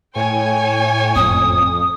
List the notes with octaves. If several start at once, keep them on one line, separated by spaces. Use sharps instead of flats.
A2 C#5 G5 G#5
F#1 F2 A2 D#6